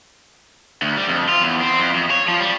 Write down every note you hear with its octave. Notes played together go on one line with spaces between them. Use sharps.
D2
G3
F2
F4
E2
C4
F2
F2
C#5
F3
G3